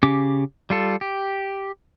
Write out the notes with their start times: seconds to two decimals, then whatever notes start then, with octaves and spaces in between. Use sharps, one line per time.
0.03 C#3 C#4 G4 D6
0.70 G3 F4 A4
1.01 G4